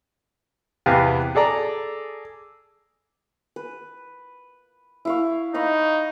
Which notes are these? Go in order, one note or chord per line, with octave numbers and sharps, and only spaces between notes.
E2 C3 B3 G4 F5 G#5
G#4 A4 D5 A#5
B4
E4 F5 C#6
D#4 F5 B5 C#6